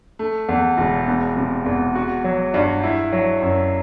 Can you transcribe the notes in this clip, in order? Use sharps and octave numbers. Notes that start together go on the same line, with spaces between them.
A3
E2
E1
B3
C3
E2
F#4
F#3
G2
E4
F#3
F#2